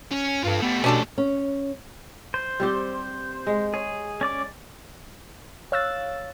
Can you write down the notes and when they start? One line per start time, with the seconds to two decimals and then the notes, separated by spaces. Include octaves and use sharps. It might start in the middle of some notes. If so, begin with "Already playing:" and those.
0.11 C#4
0.44 G2 F4 A4
0.62 A3 B3 G4
0.84 B2 C#4 D4 A4
1.18 C#4
2.34 C5
2.60 G3 C4 G4
3.47 G#3
3.74 G#4 C#5
4.21 C#4 D5 D6
5.72 C#5 F5 E6 F#6 A6